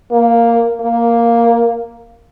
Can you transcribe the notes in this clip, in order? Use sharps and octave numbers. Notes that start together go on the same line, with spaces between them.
A#3
A#3